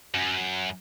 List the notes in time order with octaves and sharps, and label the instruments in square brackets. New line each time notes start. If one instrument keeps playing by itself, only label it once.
[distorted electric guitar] F#2